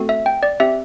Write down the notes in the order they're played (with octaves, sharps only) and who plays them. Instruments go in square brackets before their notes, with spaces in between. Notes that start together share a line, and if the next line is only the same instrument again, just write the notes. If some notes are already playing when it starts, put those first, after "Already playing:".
Already playing: [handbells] A3 C4 F#4 A4
E5
G5
D5
C4 G4 E5